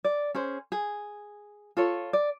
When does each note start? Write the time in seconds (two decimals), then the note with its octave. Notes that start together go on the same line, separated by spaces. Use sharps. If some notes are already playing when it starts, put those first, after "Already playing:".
0.04 D5
0.35 C#4 G#4 C5
0.72 G#4
1.77 F4 A4 C#5
2.13 D5